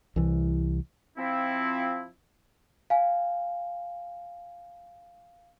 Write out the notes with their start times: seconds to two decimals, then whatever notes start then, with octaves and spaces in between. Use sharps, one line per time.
0.16 C2 E3
1.17 F3 C4 E4
2.90 F5 G#5